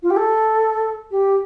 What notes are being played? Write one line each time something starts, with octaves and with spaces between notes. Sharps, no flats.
F4
G4
A4
G4